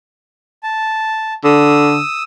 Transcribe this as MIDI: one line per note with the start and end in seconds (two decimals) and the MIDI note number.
0.63 1.33 81
1.44 2.00 50
1.44 2.23 87
1.44 2.23 88